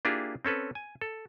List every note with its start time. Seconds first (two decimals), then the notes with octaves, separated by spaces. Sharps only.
0.05 A#3 D4 E4 F4 G4 G#4
0.45 C4 C#4 A4 B4
0.75 G#5
1.01 A4